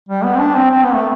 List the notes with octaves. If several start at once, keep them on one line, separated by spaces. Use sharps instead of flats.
G3
B3
C4
D4
C4
C4
B3
A3